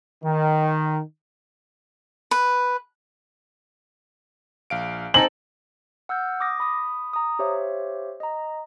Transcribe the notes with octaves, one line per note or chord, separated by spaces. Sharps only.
D#3
B4
A#1 F5 D7
C4 D#4 A4 G#5 A#5 F#7
F#5 E6 F6 G6
D6 D#6 A#6
B5 D#6
A#5 D#6
G4 C5 C#5 E5 F5
D#5 A#5